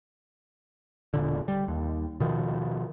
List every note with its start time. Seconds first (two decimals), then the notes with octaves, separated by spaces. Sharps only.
1.14 E1 A#2 D3
1.48 G3
1.68 D#2
2.20 B2 D#3 F3